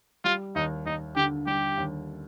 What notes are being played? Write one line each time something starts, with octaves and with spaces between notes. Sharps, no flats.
G3 F4
D#2 D#4
D#2 D#4
D3 G4
G3 G4
D#2